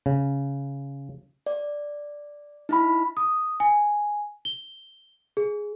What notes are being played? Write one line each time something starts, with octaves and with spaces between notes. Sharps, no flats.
C#3
D5
D#4 E4 B5
D#6
G#5
G7
G#4